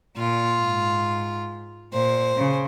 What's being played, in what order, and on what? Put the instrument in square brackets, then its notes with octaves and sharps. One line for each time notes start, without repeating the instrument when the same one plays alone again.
[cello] A#2 [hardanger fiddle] F4
[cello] G#2
[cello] A#2 [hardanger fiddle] C5
[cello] C#3